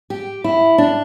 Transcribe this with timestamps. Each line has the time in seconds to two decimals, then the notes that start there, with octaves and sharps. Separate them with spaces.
0.10 G4
0.44 E4
0.78 D4